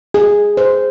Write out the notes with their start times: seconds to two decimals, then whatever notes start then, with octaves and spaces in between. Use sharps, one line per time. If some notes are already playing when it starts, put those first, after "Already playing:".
0.14 G#4
0.57 C5